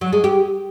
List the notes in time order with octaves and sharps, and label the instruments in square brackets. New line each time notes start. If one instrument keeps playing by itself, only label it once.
[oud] F#3
G#3
G4